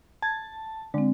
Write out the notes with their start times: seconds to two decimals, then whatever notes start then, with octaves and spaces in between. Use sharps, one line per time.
0.22 A5 G#6
0.94 D3 G#3 C4